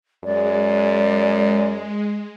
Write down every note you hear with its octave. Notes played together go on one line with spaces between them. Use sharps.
F#2 G#3 D5